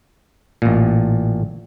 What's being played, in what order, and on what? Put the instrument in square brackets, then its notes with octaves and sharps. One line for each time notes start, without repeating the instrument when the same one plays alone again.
[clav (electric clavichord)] A1 A#2